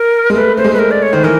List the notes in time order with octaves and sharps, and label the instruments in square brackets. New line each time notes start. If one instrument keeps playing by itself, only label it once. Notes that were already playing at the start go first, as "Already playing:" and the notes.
Already playing: [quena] A#4
[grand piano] G#3
[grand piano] A3 [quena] B4
[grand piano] A3 [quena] C5
[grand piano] G#3
[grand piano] A3 [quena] B4
[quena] A#4
D5
C#5
[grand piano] D#3 [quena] C5
[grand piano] E3 [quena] A#4